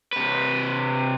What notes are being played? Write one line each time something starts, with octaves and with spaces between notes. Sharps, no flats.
C3 B4